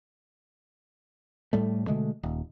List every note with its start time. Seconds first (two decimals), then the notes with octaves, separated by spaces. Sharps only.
1.53 A2 G3 A3
1.87 B2 D3 G#3 A3
2.23 D#1